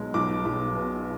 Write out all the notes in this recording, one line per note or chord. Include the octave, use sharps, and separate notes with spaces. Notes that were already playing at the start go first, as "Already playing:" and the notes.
Already playing: B1 B2 G#3
B1 D6
B1
B2